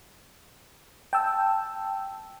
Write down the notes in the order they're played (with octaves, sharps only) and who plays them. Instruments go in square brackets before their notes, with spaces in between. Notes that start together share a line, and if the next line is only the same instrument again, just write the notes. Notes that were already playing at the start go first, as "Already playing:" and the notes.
[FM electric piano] G5 A5 E6